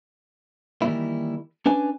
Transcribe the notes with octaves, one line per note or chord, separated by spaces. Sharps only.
D#3 E3 G3 A3 A#3 E4
C#4 D4 B4 G#5